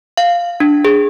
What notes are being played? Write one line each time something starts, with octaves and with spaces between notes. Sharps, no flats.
F5
D4
G#4